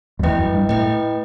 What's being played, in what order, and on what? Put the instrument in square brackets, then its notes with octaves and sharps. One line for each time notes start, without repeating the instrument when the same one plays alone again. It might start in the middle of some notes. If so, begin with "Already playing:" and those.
[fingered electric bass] F#2
[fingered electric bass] E2 [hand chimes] A3 E4 B4 D#5 G5
[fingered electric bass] F#2
G2
[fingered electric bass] A2 [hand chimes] A3 E4 B4 D#5 G5